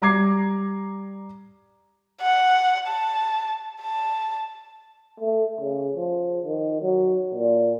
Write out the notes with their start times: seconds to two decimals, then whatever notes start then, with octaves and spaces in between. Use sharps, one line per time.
0.02 G3 A#5 D6 G#6 C7
2.21 F#5
2.87 A5
3.81 A5
5.20 A3
5.61 C#3
5.96 F3
6.46 D#3
6.82 F#3
7.35 A#2